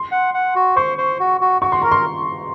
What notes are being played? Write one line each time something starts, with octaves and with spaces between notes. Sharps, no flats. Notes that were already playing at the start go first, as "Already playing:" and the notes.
Already playing: C6
F#5
F#5
F#4
C5 C#6
C5
F#4
F#4
F#4 C#6
C6
A#4 A#5
C6